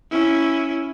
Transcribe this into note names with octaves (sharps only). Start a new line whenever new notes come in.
C#4 E4